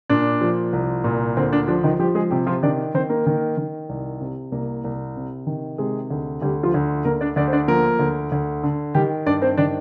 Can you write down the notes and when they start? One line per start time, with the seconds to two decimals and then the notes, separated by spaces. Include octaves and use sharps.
0.10 A#2 D4
0.41 F3
0.73 C2
1.04 A#2
1.37 D2 C4
1.53 D4
1.68 F3 D4
1.84 D#3 D#4
1.99 F3 G3 G4
2.15 G#3 G#4
2.31 C3 G3 G4
2.47 F3 F4
2.63 D#3 D4 D5
2.94 D#3 C4 C5
3.10 A#3 A#4
3.26 D#3
3.57 D#3
3.89 C2
4.21 C3
4.52 C2 A#3 A#4
4.84 C2
5.16 C3
5.47 D#3
5.78 C3 G#3 G#4
6.10 D2
6.41 D2 G3 G4
6.63 F3 F4
6.74 D2
7.05 D2 A#3 A#4
7.21 D4 D5
7.36 D2 D4 D5
7.48 C5
7.53 D4 D5
7.68 F3 A#3 A#4
7.99 D2
8.32 D2
8.63 D3
8.95 D#3 G3 G4
9.26 G2 D4 D5
9.42 C4 C5
9.57 D#3 D4 D5